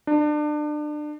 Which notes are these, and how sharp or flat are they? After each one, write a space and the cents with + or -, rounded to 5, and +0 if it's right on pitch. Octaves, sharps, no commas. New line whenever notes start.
D4 +30